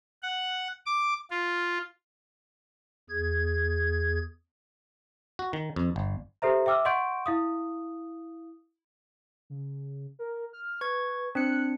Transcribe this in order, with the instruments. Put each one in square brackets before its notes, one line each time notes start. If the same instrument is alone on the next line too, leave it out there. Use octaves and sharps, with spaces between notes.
[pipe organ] F#5
D6
F4
E2 G#4 G#6
[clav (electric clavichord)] F#4
D#3
F2
G1
[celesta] G4 A4 C5 E5 A#5
E5 G5 D6 E6 F6
D#5 F#5 C6 C#6 G6 D7
E4 F5 D#6
[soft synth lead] C#3
A#4
F6
[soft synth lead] B4 [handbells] C#6 G#6
[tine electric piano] C4 [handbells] D4 C#7 [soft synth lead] F#6